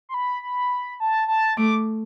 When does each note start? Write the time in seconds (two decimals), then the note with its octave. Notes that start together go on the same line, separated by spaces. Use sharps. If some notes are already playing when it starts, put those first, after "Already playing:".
0.09 C6
0.14 B5
0.42 B5
1.00 A5
1.28 A5
1.57 A3 D6